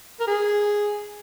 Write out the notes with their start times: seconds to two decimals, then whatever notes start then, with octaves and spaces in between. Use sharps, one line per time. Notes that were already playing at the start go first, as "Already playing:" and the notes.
0.20 A#4
0.28 G#4